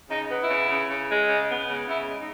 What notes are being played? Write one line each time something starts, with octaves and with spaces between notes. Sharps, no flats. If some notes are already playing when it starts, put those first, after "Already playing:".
C#3 D#4
B3
E4
C#3
C#3
C#3
G#3
C#3
B3
C#3
C#3 E4
G#3
D#4